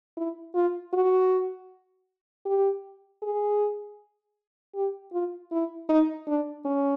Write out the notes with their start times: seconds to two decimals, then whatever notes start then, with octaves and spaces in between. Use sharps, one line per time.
0.17 E4
0.55 F4
0.93 F#4
2.45 G4
3.22 G#4
4.75 G4
5.13 F4
5.52 E4
5.89 D#4
6.28 D4
6.65 C#4